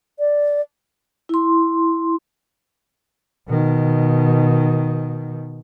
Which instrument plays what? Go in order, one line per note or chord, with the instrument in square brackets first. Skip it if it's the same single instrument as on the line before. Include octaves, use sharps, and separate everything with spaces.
[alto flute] D5
[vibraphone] E4 C6
[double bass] B2 D#3